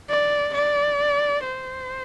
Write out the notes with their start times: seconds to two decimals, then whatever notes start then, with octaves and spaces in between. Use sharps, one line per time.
0.10 D5
0.55 D5
1.44 C5